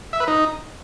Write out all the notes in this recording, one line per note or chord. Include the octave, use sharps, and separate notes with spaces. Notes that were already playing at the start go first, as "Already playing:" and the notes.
E5
B4
D#4